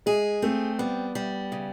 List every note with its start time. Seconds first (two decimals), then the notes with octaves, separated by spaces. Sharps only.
0.06 G#3 G#4
0.42 A3 C4
0.79 G3 B3
1.15 G3
1.52 C#3